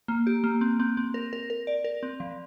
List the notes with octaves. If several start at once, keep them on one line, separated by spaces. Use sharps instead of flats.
A#3
G4
A#3
C4
C4
C4
A#4
A#4
A#4
D5
A#4
C4
F3